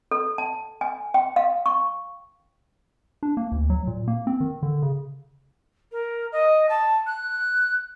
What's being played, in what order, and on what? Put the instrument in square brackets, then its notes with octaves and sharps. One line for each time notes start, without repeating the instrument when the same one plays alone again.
[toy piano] A4
A5
G#5
G5
F5
C#6
[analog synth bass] D4
A#3
D2
F#3
A#2
A#3
C4
D#3
D3
C#3
[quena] A#4
D#5
A5
F#6